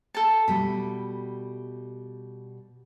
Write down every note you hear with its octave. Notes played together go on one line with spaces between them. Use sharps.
A4 A5
B2 G3 A3 B5